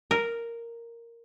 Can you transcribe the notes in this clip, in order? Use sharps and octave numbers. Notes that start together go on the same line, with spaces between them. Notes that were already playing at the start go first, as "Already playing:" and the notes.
A#4